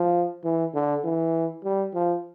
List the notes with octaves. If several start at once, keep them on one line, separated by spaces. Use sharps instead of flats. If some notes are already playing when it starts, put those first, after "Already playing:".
Already playing: F3
E3
D3
E3
G3
F3